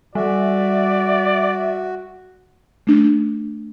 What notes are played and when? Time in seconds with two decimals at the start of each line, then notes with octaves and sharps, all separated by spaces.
0.15 G3 F#4 D5 E5
2.87 A3 D4